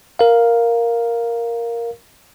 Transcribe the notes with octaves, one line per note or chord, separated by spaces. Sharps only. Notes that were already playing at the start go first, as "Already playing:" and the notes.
A#4 F5